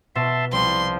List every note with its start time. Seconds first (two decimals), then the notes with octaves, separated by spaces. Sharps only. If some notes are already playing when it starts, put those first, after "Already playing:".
0.15 B2 E5 A5 C6
0.53 C2 F3 C6